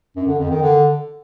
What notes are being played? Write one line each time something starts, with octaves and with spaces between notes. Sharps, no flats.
F#2
D3
F2
D#3
D3